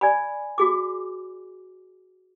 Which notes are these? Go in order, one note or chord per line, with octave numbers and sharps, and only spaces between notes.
D5 G#5 B5
F#4 G#4 D6